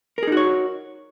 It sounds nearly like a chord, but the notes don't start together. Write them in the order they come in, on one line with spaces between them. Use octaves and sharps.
A#4 G#4 D#4 F#4 C#5